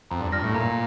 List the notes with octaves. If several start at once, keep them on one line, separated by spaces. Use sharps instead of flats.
F2 A#5
G2
G2 F6 A#6
A2
A#2 A#5